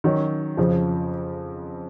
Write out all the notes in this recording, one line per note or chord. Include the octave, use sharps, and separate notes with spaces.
D#3 F#3 C#4
F2 C#3 F3